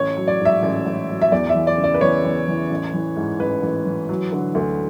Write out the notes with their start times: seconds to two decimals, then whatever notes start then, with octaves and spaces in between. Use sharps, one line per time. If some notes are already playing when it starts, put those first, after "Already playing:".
Already playing: A1 C#5
0.17 F#3
0.28 D5
0.40 G#2
0.45 E5
0.63 A1
0.86 A1
1.09 F#3
1.22 E5
1.32 E2 D5
1.49 E5
1.55 E3
1.67 D5
1.78 C#3
1.84 D5
1.94 B4
2.01 E2 C#5
2.24 E2
2.47 E3
2.71 A1
2.94 E3
3.17 G#2
3.40 A1 B4
3.63 A1
3.85 E3
4.09 F#3
4.32 D3
4.55 D2